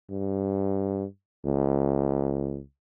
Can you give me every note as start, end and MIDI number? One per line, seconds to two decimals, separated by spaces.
0.10 1.05 43
1.45 2.61 37